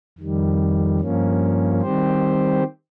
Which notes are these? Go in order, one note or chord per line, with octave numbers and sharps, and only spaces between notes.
F2 D#3 G3
G2 F3 A#3 C#4
D#3 G3 C4 G4 C5